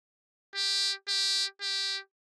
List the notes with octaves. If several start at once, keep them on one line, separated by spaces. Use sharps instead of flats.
G4
G4
G4